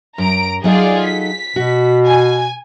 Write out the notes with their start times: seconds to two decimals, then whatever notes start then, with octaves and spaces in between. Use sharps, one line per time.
0.18 F#2 A#5 D7
0.64 F#3 D#4 F4 G#4 A4 D5
1.05 B6
1.56 B2 F#4
2.06 G#5